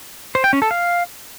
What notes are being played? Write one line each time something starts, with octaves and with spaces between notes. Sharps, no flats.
C5
G5
C#4
A4
F5